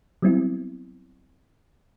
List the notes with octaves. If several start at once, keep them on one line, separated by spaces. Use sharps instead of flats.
F#3 G3 B3 C4 E4